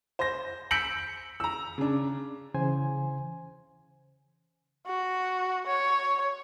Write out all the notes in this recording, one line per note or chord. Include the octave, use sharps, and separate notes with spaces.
C5 A#6
E6 G6 B6 C#7 D7 F#7
A#5 E6
C#3 D4
C#3 E3 C5 G#5
F#4
C#5